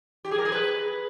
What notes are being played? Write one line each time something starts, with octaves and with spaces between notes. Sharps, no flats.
G4
G#4
A#4
G#4
B4